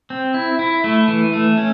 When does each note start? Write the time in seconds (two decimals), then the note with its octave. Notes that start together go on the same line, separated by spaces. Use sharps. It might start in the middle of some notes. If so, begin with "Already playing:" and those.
0.10 C4
0.34 E4
0.59 E4
0.84 A3
1.08 E3
1.33 A3
1.57 C#4